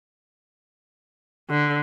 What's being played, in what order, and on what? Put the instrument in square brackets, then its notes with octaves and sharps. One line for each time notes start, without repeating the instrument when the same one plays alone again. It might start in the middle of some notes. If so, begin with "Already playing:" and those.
[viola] D3